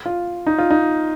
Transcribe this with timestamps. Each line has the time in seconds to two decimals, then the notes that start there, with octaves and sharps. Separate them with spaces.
0.06 F4
0.47 D#4
0.58 F4
0.70 D#4